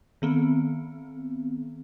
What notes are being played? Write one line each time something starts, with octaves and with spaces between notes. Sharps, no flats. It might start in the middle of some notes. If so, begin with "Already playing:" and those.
D#3 B3 C4